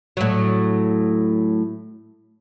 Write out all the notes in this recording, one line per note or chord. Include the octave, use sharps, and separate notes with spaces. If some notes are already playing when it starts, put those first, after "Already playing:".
A2 F#3